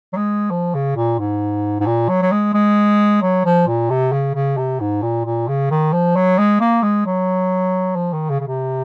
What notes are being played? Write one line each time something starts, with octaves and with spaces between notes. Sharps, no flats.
F#3
G#3
F3
C#3
A#2
G#2
G#2
A#2
F#3
F#3
G#3
G#3
F#3
F3
A#2
C3
C#3
C#3
C3
G#2
A#2
A#2
C#3
D#3
F3
F#3
G#3
A#3
G#3
F#3
F3
D#3
C#3
C#3
C3